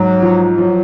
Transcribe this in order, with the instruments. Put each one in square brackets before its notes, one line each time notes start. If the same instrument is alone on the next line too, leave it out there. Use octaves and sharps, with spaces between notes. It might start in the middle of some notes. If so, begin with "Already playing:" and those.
Already playing: [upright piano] G#2 [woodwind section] F#3
[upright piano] F3
[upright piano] F3 [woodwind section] F#3